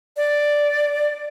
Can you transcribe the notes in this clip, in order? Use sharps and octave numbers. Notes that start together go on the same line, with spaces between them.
D5